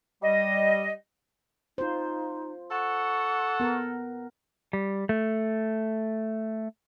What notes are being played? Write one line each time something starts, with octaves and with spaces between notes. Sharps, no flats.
G3 D#5
D#4 F4 C5
A4 F#5 C#6
B3 A#4
G3
A3